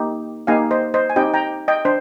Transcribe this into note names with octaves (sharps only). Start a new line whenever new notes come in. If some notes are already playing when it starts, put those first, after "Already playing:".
Already playing: A#3 D#4 G4
A#3 D#4 G4 F5 G#5
C5 D#5
C5 D#5
G#5
C4 D#4 G4 D#5 G5
G5 A#5
D#5 G5
D4 C5